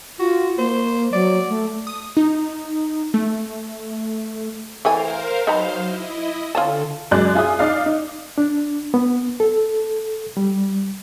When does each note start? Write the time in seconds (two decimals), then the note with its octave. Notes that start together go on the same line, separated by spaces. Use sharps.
0.19 F4 F#4
0.58 A#3 C5
1.13 F#3 D5
1.49 A3
1.87 D#6
2.17 D#4
3.14 A3
4.85 E3 A3 A#4 C5 F5 G#5
5.47 F#3 D#4 B4 C5 F5 A#5
5.81 E4 D#5
6.55 D3 F4 A4 C#5 A5
7.11 F#2 G#3 D5 F#6
7.35 F4 G#4 E5 D#6
7.59 D#4 D5 F5
7.86 D#4
8.38 D4
8.94 B3
9.40 A4
10.37 G3